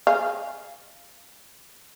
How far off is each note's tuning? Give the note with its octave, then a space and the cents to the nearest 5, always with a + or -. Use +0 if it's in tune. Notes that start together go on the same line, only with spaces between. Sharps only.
G#4 +0 F5 -5